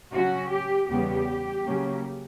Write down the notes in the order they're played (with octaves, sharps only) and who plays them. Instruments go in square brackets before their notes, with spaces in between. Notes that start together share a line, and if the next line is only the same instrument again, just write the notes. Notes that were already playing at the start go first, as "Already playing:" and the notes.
[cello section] C#3 F#3 C#4 F#4
G4
E2 C#3 G3 B3 G4
C#3 F#3 A#3 C#4